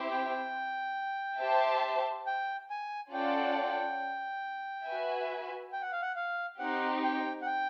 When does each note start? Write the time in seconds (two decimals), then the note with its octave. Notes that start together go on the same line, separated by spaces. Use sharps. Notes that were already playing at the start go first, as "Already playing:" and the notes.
Already playing: C4 E4 G4 C5 E5
0.11 G5
1.40 G4 C5 E5 A5
2.26 G5
2.70 G#5
3.13 C#4 F4 A4 D5 F#5 G5
4.87 F#4 B4 E5 G#5
5.73 G5
5.82 F#5
5.92 F5
6.02 F#5
6.16 F5
6.59 C4 D#4 G4 F#5
7.02 G5
7.42 F#5
7.46 G5